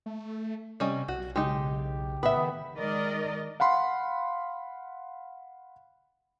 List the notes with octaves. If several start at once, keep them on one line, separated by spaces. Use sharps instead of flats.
A3
C3 G3 C#4 D#5
B1 F#4
C#3 G#3 D#4 G4
A2 B3 B4 E5
D#3 D#6
D#3 G#3 A#4 D5 D#5
F5 F#5 B5 C6